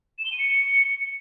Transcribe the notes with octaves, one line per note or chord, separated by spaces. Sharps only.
E7
G7
D#7
C#7